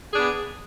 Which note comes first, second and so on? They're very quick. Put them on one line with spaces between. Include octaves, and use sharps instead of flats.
G#4 D4 B3